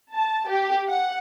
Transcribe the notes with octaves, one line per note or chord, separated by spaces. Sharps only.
A5
G4
F#5